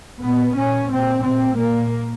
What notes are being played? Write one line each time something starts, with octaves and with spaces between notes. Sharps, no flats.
A#2 B3
A#2 C#4
A#2 C4
A#2 C4
A#2 A#3